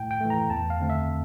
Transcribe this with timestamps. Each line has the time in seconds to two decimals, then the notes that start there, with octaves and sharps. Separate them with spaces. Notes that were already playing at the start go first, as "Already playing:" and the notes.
Already playing: A2 G5
0.11 G5
0.21 E3 A3
0.30 A#5
0.50 E2 A5
0.70 F5
0.80 D3 A3 C4
0.90 E5